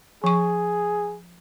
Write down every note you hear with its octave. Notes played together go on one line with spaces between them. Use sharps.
F3 G#4 C#6